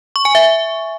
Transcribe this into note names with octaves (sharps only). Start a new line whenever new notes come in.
C#6
G#5
E5